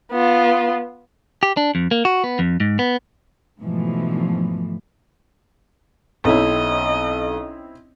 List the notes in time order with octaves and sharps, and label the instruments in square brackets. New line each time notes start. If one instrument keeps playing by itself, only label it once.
[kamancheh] B3 F4
[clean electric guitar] G4
D4
F2
A#3
F#4
B3
F2
G#2
B3
[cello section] G#2 B2 D3 E3 F3 A3
[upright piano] B1 [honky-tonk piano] C4 C#4 E4 [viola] D#5